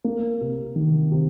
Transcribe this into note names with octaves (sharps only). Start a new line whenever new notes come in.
A#3
C3
D#3
C3